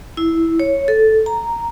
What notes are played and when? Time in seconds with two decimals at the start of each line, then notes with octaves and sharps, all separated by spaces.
0.17 E4
0.60 C#5
0.88 A4
1.26 A#5